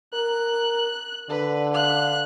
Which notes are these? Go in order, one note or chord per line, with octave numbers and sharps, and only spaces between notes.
A#4 F#6
D3 B4
F5 F#6